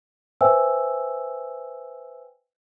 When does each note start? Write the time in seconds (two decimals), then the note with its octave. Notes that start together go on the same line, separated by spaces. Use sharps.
0.41 B4 C5 E5 G5 G#5 E6